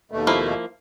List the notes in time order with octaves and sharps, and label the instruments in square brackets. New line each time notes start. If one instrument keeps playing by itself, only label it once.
[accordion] D#2 B2 A3
[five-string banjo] F3 A#3 E4